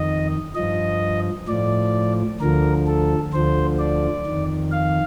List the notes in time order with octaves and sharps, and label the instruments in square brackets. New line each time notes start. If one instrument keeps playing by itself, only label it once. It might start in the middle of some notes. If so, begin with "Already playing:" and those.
Already playing: [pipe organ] F2 D#3 D#5
G2 F3 D#5
A2 F3 D5
D2 D3 F3 A#4
A4
D2 D3 F3 C5
D5
F2 D#3
F5